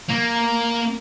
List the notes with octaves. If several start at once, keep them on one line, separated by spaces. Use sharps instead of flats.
A#3